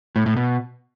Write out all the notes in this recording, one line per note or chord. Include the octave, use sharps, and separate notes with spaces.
A2
A2
B2